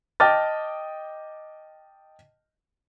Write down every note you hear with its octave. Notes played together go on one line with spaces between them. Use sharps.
D#5 G5 A5 D6 F6 A6